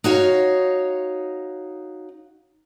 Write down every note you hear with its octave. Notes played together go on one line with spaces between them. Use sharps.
D#4 F#4 C#5 F5